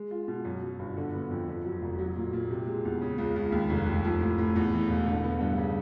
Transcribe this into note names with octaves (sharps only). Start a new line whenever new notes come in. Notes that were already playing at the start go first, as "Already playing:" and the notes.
Already playing: G#3
F4
B2
F#2
F#3
G1
D3
B3
F2
F2
F#3
F1
F#3
A#2
A#2
C3
G#3
E2
C#3
C#2
C#2
D#2
F1
F1
F3
A2
A2
E2
E3
E1
D3
B3
G2
C#3